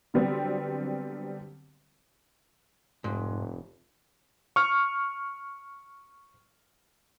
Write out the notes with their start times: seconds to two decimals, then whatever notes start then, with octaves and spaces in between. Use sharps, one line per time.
0.14 D3 F#3 G3 B3 C4
3.04 F1 G#2
4.56 C#6 F6